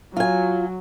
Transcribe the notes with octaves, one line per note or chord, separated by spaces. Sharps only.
F#3 F4 G#5